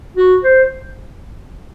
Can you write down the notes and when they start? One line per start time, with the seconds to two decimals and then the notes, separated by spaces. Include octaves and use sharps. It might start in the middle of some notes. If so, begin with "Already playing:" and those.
0.17 F#4
0.43 C5